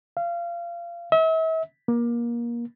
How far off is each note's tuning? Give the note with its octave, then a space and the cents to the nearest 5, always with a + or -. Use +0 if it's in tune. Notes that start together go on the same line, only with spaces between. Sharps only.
F5 -25
E5 -40
A#3 +25